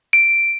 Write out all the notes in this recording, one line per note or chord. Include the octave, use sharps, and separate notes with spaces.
D7